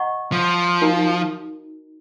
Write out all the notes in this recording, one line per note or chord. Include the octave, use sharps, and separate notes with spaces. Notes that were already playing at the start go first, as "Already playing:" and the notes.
Already playing: D#5 F#5 A#5 C#6
F3
D#4 F#4 A#4 D#5 A#5